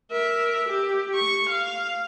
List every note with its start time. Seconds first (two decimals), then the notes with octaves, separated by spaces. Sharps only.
0.11 A#4 E5
0.68 G4
1.15 C#6
1.50 F5